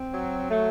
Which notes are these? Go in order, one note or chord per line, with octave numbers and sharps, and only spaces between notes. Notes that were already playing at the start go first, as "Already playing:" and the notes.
Already playing: C4
F#3
A3